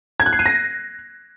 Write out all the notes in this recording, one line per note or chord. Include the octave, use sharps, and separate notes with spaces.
G#6
F#6
C7
D#7
A#6